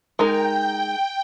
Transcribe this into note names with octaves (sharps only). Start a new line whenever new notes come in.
G#3 D#4 A#4 G5
G5